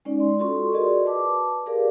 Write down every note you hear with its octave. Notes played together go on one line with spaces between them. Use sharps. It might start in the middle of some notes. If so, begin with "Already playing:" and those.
G#3 C#4 D#4 D5
D5 C6
F4 F#4 A4 C6 C#6
F#4 G#4 A#4 D5 D#5
B4 A5 D6
G4 G#4 A#4 B4 D5 F5